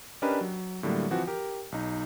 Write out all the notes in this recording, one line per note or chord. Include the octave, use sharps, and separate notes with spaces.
C#4 D4 G4 A#4 B4 D#5
F#3
A2 D3 F#3 G3 A#3
E3 F3 C4 F#4
G4 A#4
B1 D#4